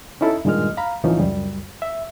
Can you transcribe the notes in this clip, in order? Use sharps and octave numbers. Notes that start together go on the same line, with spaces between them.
C#4 D#4 E4 A4
G2 A#2 D#3 G#3 D#5 F6
F5 A#5 B5
C2 A2 E3 F3 C#4 D#4
C#2 F#2 G3
E5